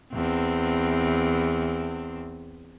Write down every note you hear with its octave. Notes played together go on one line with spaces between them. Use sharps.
E2 C4